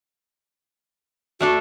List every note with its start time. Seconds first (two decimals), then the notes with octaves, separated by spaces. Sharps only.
1.41 A3 D4 F#4 A4